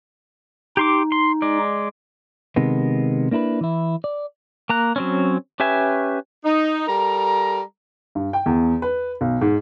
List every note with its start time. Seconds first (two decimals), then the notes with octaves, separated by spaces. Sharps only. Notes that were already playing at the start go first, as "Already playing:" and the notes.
0.77 D#4 G4 C6 D6
1.12 C6
1.42 G#3 D5
2.56 C3 D#3 G#3 B3
3.31 A#3 D4 E4 A#4 B4
3.61 E3 E4
4.04 D5
4.69 A#3 A#5 F#6
4.96 F#3 C4 C#4
5.60 C#4 G4 B4 E5 G#5
6.45 D#4
6.88 G3 A4 A#4 A#5
8.15 G2
8.33 G5
8.46 E2
8.82 B4
9.21 B1
9.41 G#2